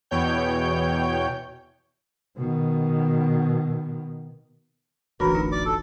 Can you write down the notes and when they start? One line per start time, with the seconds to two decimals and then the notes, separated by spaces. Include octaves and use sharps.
0.11 E2 B2 C#5 G5 G6
2.37 B2 D#3
5.20 D1 A1 E3 D4 F#4 A#4 B4 B5
5.35 D4 D#4 F4 F#4
5.52 D5 D6
5.66 A4